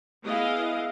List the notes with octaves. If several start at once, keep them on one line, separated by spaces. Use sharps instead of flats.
B3 E4 G#4 D#5 F5